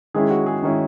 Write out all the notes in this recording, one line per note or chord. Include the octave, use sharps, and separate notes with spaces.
D#3 G#3 C#4 E4 G#4
F#4
G#4
D#3 G#3 C#4 E4